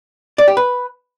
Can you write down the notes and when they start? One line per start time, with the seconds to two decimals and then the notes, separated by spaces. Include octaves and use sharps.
0.38 D5
0.48 G4
0.57 B4